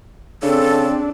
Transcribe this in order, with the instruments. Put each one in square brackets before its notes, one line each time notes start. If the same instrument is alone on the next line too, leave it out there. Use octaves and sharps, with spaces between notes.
[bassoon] C#3 [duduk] C4 [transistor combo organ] D4 [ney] A4